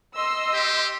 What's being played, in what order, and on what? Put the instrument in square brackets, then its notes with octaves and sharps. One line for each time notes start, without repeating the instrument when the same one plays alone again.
[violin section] D#5 C6 E6
[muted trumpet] G4